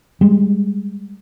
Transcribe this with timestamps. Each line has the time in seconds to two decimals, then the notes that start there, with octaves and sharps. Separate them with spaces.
0.21 G3 G#3